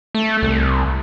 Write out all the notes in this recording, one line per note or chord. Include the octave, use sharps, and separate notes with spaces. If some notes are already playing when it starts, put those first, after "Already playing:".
A3
C2